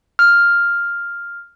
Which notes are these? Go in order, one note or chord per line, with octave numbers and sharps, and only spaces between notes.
F6